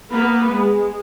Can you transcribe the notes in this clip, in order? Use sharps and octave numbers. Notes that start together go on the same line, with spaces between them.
A#3 B3 B4
G#3